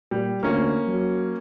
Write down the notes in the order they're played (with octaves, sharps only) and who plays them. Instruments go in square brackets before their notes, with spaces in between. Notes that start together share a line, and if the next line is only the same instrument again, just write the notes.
[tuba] A#2 [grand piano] G3
[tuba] D2 [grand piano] A#3 C#4
[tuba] F#3